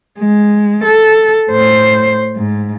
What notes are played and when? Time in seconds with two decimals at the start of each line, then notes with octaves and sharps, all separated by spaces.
0.19 G#3
0.84 A4
1.51 A2 C5
2.36 G#2